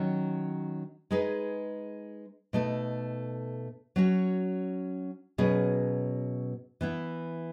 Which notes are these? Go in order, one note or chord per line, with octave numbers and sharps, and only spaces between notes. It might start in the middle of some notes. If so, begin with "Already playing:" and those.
Already playing: D#3 F#3 C#4
G#3 D#4 G#4 B4
B2 A3 D#4 A4
F#3 C#4 F#4
B2 F#3 C#4 G#4 B4
E3 B3 E4